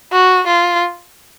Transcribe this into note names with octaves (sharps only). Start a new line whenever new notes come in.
F#4
F4